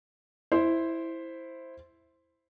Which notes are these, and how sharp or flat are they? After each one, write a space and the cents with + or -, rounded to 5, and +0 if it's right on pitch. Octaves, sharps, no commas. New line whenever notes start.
E4 +0 C5 +0